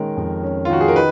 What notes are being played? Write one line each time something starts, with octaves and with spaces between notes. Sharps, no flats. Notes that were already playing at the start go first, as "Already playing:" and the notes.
Already playing: D#3 G#3 C#4 A#4
F2
C#4
F4
D#3 F#4
G#4
A#4
D#4 B4